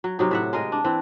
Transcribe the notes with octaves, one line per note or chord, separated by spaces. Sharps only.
F#3
C3 F#3 D#4
A2 E5 F#5
G#3 A#4 D#5
D4
E3 C4